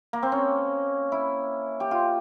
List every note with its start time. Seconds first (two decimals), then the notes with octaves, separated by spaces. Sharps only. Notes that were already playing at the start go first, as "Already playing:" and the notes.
0.13 A#3
0.23 C4
0.32 C#4
1.12 E4
1.80 G4
1.91 F4